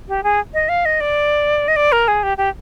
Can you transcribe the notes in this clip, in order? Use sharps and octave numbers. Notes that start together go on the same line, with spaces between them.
G4
G#4
D#5
F5
D#5
D5
D#5
D5
A#4
G#4
G4
G4